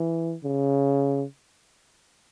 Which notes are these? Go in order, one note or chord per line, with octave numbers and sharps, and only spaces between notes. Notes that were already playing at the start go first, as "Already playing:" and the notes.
Already playing: E3
C#3